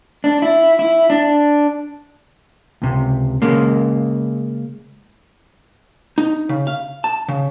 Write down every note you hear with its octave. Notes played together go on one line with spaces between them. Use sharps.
D4
E4
E4
D4
C#2 C3
C#3 G#3 A#3
D#4
C#3
F5
A5
C#3